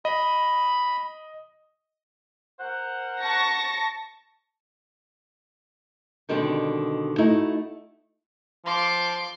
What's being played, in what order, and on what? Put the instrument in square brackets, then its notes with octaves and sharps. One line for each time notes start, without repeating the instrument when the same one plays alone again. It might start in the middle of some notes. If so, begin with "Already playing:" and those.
[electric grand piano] D#5 [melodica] B5
[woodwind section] A#4 C5 F#5
[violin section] A5 C#6 A#6
[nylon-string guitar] B2 D3 D#3 G3 C4
A3 D#4 E4 F#4
[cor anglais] F3 [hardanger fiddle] C6 D6